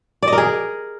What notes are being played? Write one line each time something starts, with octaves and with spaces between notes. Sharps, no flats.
D5
D#5
A#4
G#4